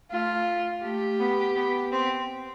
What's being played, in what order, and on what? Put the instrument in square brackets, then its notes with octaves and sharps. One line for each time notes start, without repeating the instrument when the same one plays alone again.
[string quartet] A3 [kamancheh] F4
[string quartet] A3 [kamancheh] G4
[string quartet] B3
B3
C4